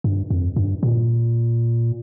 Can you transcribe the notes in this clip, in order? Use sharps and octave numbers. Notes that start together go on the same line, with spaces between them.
G2
F2
G2
A#2